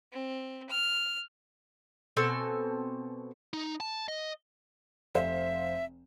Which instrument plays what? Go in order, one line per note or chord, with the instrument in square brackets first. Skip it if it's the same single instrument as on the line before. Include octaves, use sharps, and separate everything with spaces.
[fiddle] C4
F6
[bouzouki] B2 C4 A4 G#5
[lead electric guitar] D#4
A5
D#5
[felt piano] F1 C5 F5 [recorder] E5